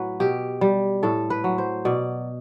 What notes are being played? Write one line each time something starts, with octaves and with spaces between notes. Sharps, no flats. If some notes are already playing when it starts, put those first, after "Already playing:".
Already playing: A2 F#3 B4
B2 G4
G3
A2 A4
B4
F#3
C5
B2 D5